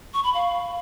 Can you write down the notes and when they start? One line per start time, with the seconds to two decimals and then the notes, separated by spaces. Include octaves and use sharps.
0.14 C#6
0.24 B5
0.34 F5